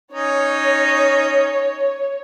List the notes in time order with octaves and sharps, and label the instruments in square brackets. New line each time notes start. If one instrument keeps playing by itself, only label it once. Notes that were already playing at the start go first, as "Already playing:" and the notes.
[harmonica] C#4 D#4 [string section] C#5